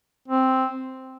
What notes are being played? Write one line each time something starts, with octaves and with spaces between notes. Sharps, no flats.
C4